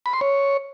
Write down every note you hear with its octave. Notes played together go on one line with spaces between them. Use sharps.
B5
C6
C#5